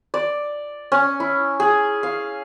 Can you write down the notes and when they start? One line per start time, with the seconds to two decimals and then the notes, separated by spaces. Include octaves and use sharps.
0.14 D5
0.92 C#4
1.20 E4
1.60 G#4
2.03 F5